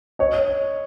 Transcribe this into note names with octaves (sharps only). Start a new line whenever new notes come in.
C#5 D#5